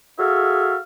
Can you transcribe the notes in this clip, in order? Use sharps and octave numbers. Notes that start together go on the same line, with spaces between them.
F#4 G#4 A4 E5 F5